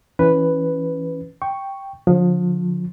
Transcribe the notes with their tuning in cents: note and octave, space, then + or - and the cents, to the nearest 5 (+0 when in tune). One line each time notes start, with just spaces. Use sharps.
E3 -5 C#4 +0 B4 +0
G5 +0 C#6 +0
D3 -10 F3 +35